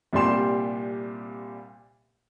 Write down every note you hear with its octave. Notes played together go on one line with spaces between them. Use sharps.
C2 A#2 G3 G4 C6 E7